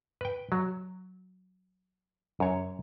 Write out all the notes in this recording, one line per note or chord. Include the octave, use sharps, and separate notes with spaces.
B4 G5
F#3
F#2 C#5